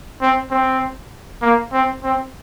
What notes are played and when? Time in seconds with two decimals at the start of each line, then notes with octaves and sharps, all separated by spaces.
0.21 C4
0.51 C4
1.42 A#3
1.73 C4
2.03 C4